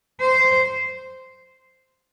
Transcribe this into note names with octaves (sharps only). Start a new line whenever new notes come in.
C5